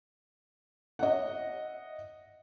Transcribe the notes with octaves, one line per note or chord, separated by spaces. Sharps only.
D#5 E5 F#5